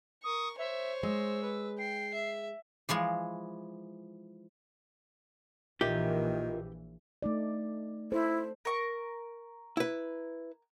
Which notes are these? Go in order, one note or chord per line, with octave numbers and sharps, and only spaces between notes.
A#4 C#6 D#6
C5 C#5 E5
G#3 E6
B4
G5 C7
E5
E3 F3 G#3 F4
A#1 D#3 E3 F4 G4 A#4 E5
A3 D#4 D5
E4 A4 C5
A#4 C#6
E4 B4